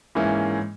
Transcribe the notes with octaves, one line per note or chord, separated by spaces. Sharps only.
G#2 E3 A#3 C#4 E4